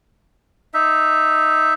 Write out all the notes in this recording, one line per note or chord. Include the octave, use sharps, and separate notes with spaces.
D#4 E5